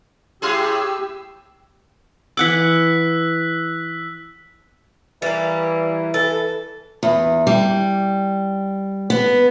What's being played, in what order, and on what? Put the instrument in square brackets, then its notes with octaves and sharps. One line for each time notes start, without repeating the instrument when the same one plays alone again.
[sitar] A2 E4 G#4 [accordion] G4 E6
[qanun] E3 F#5 D6 [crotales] E6 F#6 B6
[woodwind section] E3 [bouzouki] G3 A#3
[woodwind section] E3 [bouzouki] A4
[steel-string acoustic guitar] E2
G3
B3